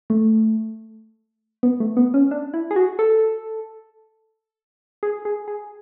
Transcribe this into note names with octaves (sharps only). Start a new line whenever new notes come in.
A3
B3
A3
B3
C#4
D4
E4
G#4
F#4
A4
G#4
G#4
G#4